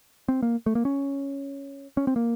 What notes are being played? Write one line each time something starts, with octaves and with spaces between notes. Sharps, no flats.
C4
A#3
A3
A#3
C#4
C#4
C4
A#3